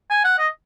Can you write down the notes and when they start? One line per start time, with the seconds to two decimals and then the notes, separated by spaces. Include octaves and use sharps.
0.10 G#5
0.24 F#5
0.39 D#5